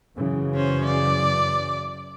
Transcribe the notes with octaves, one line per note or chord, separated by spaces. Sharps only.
F#2 C#3 E3
C#4 C5
D5